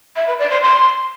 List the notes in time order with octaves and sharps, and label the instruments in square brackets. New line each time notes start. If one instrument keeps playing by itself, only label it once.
[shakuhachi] E5
B4
D5
C5
C6